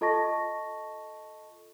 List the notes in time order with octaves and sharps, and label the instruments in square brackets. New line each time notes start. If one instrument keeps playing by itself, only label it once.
[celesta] F4 A4 D#5 A5 C#6 A#6